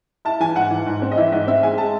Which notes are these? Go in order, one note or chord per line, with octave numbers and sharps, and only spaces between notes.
E4 A5
E3 G#5
G#2 F#5
E3
G#2
C4
D#5
E3 E5
G#2 D#5
C4 E5
G#3 G#5
G#3 A5